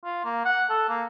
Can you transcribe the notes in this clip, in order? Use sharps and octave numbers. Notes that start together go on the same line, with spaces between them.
F4
A#3
F#5
A4
A#3